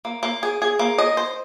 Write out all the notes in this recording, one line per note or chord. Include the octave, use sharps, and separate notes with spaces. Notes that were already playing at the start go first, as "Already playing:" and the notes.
A#3
A#3
G#4
G#4
A#3
D#5
C5